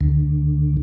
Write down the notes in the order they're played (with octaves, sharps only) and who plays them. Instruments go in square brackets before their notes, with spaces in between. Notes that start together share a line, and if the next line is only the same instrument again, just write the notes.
[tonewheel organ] D2